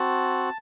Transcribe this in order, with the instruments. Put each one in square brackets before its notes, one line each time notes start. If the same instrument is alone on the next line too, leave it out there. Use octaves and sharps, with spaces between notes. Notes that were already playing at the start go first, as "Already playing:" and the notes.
Already playing: [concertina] C4 F#4 A5